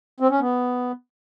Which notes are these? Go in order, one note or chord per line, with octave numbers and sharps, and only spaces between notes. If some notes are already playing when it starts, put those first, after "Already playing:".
C4
C#4
B3